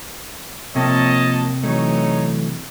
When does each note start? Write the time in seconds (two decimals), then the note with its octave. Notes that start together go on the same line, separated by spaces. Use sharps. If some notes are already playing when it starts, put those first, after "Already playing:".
0.76 C3 F3 A#3 C#5 D#5 A5
1.63 E3 F#3 A3 D#4 C#5